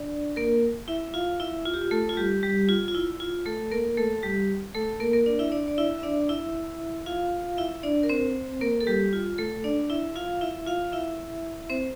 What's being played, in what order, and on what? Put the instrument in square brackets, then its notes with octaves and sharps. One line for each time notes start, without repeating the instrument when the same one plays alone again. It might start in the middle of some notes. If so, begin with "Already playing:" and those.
Already playing: [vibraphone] D4 D5
A#3 A#4
E4 E5
F4 F5
E4 E5
F4
G4
F4
A3 A4
F4
G3 G4
G3 G4
F4
F4
E4
F4
A3 A4
A#3 A#4
A3 A4
G3 G4
A3 A4
A#3 A#4
A#3 A#4
D4 D5
E4 E5
D4 D5
D5
E4 E5
E5
D4 D5
E4 E5
F4 F5
E4 E5
D4 D5
A#4
C4 C5
A#3 A#4
A4
G3 G4
F4
A3 A4
D4 D5
E4 E5
F4 F5
E4 E5
F4 F5
E4 E5
C4 C5